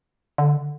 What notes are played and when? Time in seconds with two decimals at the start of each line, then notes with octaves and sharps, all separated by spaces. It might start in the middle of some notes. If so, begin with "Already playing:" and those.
0.38 D3